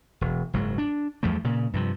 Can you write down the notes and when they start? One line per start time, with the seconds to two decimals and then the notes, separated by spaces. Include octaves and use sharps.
0.21 E1
0.53 F#1 G#2 F#3
0.78 D4
1.23 E2 F3 G3 A3
1.44 A#2 C#3
1.73 G2 C3 F3